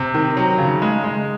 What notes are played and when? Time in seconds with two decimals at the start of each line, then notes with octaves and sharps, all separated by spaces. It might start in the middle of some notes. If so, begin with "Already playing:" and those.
Already playing: C3
0.14 D#3
0.37 F#3
0.58 C#3
0.82 G#3
1.04 G#3